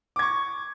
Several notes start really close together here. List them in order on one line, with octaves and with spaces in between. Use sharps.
D6 G#6 C#6